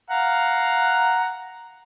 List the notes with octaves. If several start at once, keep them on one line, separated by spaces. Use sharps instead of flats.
F5 F#5 A#5